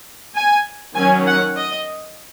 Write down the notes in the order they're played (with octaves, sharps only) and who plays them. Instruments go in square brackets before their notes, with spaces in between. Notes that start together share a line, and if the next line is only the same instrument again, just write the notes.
[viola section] G#5
D#3 F#3 C#4 G#5
F#5
D#5